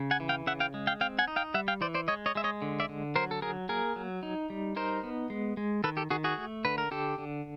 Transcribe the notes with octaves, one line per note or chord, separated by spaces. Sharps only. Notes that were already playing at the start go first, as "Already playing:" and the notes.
Already playing: C#3
F#5 G#5
E3
F5 G5
C#3 E5 F#5
F5 G5
G#3
F5 G5
C4 F5 G5
F#5 G#5
D#4
F5 G5
G3 E5 F#5
F5 G5
E3 C5 D5
C5 D5
G#3 C#5 D#5
C#5 D#5
G#3 E5
C#5 D#5
D3
D5 E5
D3
F#3 A#4 C5
A4
F#3 G#4 A#4
A#3 G#4 A#4
F#3
D#4
G3
D#4 A#4 C5
B3
G#3
G#3
D#3 A4 B4
G4 A4
D#3 F#4 G#4
F#4 G#4
A3
D3 B4
A#4
D3 G4 A4
D3